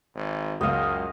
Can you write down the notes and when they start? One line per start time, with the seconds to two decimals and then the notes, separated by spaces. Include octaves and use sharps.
0.15 G#1
0.61 C#2 F#2 D#5 F5